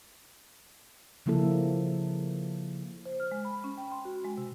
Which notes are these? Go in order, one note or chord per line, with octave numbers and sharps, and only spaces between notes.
C#3 F3 A#3 E4 A4
C5
F6
G#3
B5
C#4
G5
C6
F#4
G#3
C3